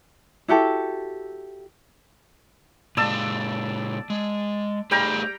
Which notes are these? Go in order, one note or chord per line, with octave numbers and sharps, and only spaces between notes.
E4 F#4 G4 A4
A#2 G#3 D5 A5 E6
G#3
G3 A3 G#4 C5 G5 A#5